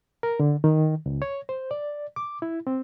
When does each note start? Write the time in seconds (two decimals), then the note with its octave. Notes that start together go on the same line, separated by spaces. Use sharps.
0.23 A#4
0.40 D3
0.64 D#3
1.06 C#2
1.22 C#5
1.49 C5
1.71 D5
2.16 D6
2.42 E4
2.67 C4